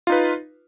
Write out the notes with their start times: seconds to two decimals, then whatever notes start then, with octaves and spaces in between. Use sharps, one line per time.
0.07 F4
0.10 D#4
0.12 B4